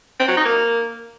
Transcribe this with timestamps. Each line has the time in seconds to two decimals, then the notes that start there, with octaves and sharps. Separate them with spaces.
0.20 C4
0.28 F#3
0.37 D#4
0.45 A#3